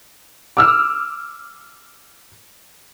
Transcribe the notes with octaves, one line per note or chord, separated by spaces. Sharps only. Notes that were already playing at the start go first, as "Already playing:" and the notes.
D6 E6 F6